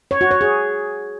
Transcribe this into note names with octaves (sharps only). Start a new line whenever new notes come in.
C#5
F#4
C#5
G#4